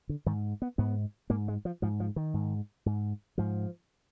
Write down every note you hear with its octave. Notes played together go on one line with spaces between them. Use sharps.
D3
G#2 D#3
B3
G#2 B3
G#2 A#3
G#3
F3
G#2 F3
F3
D#3
G#2
G#2
G#2 F3